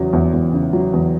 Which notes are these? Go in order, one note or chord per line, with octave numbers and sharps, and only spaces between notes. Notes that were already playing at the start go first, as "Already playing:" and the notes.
Already playing: E2 C#3 F#3
E2
E2
C#3
F#3
E2